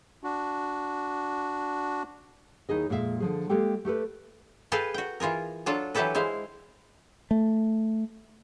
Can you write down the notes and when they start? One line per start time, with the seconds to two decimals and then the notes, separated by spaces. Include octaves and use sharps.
0.24 D4 F#4
2.69 D#2 D#4 E4 G#4 D#5
2.89 F2 A#2 G#3 B3 E5 F5
3.20 D3 F3 G#4
3.49 G#3 A#3 G4 A4 G5
3.85 A3 G4 A4 B4
4.72 G#4 A4 B4 F5 G5
4.94 F#4 G5
5.20 E3 F4 G#4 A#4
5.66 F#3 D4 F4 A4
5.95 E3 F#3 E4 G4 A4 B4
6.15 G#3 E4 C5 F5
7.31 A3